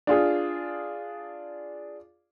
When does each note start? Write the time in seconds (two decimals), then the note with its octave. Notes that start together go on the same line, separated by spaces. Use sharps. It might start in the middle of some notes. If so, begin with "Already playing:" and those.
0.07 D4 F4 G#4